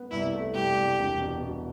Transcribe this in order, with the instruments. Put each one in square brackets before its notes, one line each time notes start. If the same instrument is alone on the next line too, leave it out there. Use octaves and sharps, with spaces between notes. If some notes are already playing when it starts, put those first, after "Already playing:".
Already playing: [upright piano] B3
[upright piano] C2 [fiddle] E4
[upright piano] A3
[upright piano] C2 [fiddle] G4
[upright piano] C2
E1
B2
B2